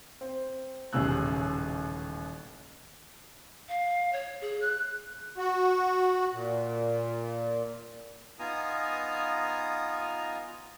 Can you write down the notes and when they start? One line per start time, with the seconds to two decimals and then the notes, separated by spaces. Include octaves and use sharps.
0.21 C4
0.93 D#1 A1 C#3 E6 F#6
3.69 F5
4.13 C#5
4.41 G#4
4.61 F#6
5.38 F#4
6.33 A#2
8.39 B3 D#4 F4 G#5 A#5 D#6